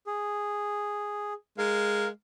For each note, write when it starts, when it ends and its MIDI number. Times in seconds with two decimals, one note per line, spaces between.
0.07 1.33 68
1.58 2.08 56
1.58 2.08 70
1.58 2.08 77